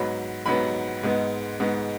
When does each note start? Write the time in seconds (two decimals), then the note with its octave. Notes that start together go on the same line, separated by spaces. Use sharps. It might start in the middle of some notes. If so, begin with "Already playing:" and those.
Already playing: G#2 F#3 B3 B5
0.46 G#2 F#3 B3 B5
1.03 G#2 G#3 B3
1.60 G#2 G#3 B3